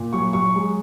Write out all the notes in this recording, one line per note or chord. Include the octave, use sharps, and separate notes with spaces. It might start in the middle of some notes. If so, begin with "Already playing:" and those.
Already playing: A#2
F#3 C#6
F#3 C#6
G#3